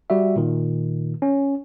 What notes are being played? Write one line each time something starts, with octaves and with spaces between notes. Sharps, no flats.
G3 F#4 E5
A#2 D#3
C#4